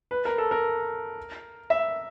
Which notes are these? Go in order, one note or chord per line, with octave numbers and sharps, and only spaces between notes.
B4
A#4
A4
A#4
E5